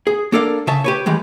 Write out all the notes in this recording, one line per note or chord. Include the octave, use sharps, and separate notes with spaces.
G#4
A#3 D4 A4 A#4 D5 F5
C#3 E5 A5
G4 B4 C#5
D#3 E3 G3 G#3